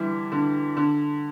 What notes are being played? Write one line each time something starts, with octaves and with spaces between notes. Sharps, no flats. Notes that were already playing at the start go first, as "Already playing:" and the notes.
Already playing: D3 E3 G3
D3
D3